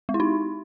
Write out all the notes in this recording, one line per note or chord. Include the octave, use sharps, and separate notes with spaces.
G#3
E4
D#4